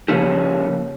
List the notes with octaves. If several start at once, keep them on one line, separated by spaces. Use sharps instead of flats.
C#3 F3 A#3 C#4 E4 G4